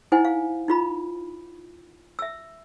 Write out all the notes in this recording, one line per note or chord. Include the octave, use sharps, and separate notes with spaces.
D#4 E4 C5 F#5 G#5
F5
D#4 F4 B5
E5 E6